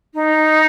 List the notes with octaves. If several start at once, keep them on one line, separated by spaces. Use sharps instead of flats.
D#4